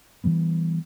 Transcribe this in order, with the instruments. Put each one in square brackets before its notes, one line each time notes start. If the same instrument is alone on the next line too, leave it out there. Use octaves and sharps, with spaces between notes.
[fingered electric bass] E3 F3 G3 B3